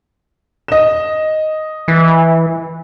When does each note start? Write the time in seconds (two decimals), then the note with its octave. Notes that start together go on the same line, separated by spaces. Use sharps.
0.68 D#5 E7
1.88 E3